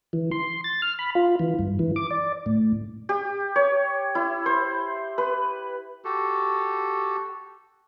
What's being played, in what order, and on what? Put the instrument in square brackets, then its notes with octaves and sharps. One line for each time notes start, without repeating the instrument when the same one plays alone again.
[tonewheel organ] E3
C6
A6
F6
B5
F4
E3
G2
E3
D6
D5
A2
[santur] G4
C#5
E4
C5
B4
[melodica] F#4 G4 A4